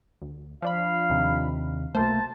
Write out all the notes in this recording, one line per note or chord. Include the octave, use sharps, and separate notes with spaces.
D2
F3 D4 F5 B5
D#2 C3
B1 A3 A#3 C5 A5